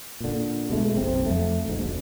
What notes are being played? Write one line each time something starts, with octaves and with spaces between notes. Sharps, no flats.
A#2 D3
B2 G#3 A3
F#1 B1 C3 C4
F2 A3
A#1 G#2
F1 D2